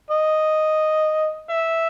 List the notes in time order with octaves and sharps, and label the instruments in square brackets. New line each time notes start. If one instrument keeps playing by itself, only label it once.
[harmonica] D#5
E5